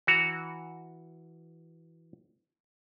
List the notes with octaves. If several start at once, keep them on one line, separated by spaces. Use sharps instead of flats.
E3 F#4 A#5